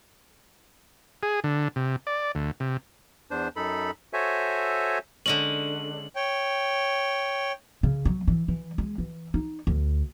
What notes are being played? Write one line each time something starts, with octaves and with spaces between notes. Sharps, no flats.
G#4
D3
C3
D5
D2
C3
E2 D4 C5
F#2 D#4 A4 B5
F#4 A4 C5 C#5 E5 G#5
D3 G#3 C#4 F#7
C#5 G5
C#3
F#3
E3
E3
G#3
E3
D#4
D2